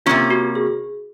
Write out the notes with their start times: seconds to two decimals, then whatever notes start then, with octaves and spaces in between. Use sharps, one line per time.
0.06 C3 D#3 A#3 C#4 F4
0.30 F#4
0.55 G#4